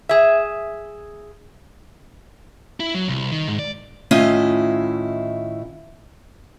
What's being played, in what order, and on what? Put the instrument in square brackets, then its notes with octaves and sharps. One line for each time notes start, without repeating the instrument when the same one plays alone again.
[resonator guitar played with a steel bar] G#4 E5
[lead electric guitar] E4
F#3
C2
D#3
G#2
D5
[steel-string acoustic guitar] A2 D#3 C#4 E4 F4 D#5